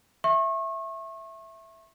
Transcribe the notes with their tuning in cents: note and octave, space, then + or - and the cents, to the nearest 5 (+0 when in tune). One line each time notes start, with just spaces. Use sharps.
E5 +0 C#6 -35